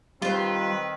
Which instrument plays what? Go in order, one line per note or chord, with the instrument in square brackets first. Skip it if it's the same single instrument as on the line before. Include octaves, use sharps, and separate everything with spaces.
[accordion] D#3 [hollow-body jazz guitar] G3 [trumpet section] C4 B4 [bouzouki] F4 C5